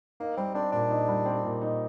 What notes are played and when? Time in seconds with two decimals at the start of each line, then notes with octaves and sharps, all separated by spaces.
0.20 A#3 D#4
0.37 G3 C4
0.55 C4 D4
0.72 A#2 D4
0.90 D#4
1.08 G3
1.26 C4
1.44 A#2
1.62 D#4